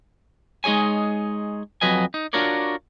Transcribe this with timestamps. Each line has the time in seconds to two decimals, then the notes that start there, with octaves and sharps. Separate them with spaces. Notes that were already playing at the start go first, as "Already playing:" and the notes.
0.64 G#3 D#4 G#4 C#5 G#5
1.81 F2 F#3 B4 D#5 G#5
2.14 D#4
2.33 D4 F4 F#4 A#4 C#5 D5